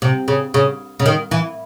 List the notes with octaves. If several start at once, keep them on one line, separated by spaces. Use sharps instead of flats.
C3
C#3
C#3
C#3
D#3
E3